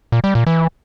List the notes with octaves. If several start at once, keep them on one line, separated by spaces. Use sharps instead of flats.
A#2
G3
A#2
E3